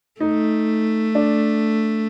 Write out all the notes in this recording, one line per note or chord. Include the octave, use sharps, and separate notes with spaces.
A3 D#4
D4